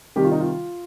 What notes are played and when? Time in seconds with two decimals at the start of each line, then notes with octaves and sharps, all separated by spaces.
0.16 C3 D#3 G3 G4
0.24 F4
0.32 D#4
0.40 F4